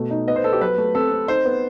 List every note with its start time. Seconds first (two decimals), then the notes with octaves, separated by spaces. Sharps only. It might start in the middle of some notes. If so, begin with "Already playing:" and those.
Already playing: B2 A3
0.11 D#4
0.27 B3 D#5
0.36 C5
0.44 B3 A4
0.53 G4
0.61 F#3 B4
0.78 A3
0.95 C4 A4
1.11 C4
1.28 D#4 C5
1.45 B3